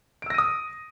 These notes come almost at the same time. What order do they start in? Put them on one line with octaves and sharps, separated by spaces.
D7 E6 A#6 D#7 D#6